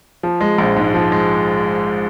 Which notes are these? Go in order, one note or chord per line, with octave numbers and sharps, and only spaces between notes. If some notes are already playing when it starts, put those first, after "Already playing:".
F3
G#3
A#1
G#2
F3
G#3